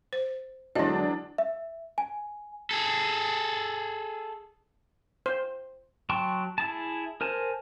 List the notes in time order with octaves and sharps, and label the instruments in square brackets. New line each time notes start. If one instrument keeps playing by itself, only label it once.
[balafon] C5
[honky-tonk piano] E2 D4 [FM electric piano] D3 F#3 G#3 [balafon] E3 D#5
[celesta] E5
G#5
[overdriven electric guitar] G#4 A4
[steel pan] C5
[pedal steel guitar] F#3 G5 A5 C6 C#6
E4 G#4 A5
A#4 C5 G#5 A5